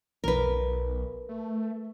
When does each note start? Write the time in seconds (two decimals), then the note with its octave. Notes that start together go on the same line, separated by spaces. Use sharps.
0.24 B1 A#4 B4
1.29 A3